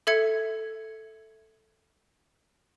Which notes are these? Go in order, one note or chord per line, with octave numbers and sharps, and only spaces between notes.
A4 E5 G#6 C#7